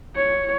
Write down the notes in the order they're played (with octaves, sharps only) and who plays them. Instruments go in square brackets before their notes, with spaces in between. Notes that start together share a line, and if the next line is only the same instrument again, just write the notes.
[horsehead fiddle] C#5